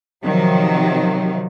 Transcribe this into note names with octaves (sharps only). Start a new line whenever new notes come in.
C3 D#3 F3 F#3